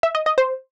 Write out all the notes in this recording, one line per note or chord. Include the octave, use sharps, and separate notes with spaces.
E5
D#5
D#5
C5